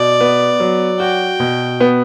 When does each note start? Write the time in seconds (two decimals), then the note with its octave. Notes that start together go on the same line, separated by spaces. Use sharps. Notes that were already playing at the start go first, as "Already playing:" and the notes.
Already playing: B2 D5
0.21 B3
0.60 F#3
1.00 F#4 G5
1.40 B2
1.80 B3